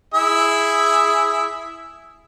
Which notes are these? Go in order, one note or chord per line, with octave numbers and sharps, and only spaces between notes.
E4 G#4 E5